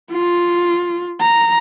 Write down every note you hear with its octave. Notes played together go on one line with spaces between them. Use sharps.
F4
A#5